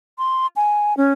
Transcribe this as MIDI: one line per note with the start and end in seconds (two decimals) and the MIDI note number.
0.18 0.47 84
0.56 0.96 80
0.97 1.13 61